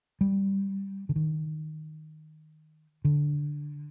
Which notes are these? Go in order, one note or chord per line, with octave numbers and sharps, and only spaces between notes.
G3
D3
D#3
D3